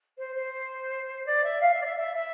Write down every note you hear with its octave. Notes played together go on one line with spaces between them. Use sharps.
C5
C5
D5
E5
F5
E5
D5
E5
E5
E5